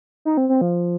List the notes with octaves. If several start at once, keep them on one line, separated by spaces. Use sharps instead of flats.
D#4
C4
C4
F3